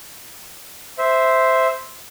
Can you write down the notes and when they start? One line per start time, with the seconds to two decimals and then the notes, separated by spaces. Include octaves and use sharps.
0.98 C5 E5